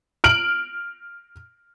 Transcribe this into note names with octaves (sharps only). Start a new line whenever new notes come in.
F6 D7 F#7